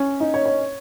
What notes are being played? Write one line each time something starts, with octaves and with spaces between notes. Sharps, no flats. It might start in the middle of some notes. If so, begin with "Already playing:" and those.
Already playing: C#4
D#4
C#5
C#5